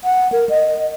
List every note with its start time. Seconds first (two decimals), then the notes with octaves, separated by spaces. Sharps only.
0.04 F#5
0.32 A#4
0.49 D#5